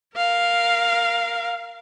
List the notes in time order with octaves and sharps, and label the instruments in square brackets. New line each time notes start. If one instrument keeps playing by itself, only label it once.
[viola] A#4 F5